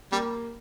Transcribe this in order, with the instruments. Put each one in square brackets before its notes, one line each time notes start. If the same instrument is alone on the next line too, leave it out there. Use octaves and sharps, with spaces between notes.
[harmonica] G3 [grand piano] A#3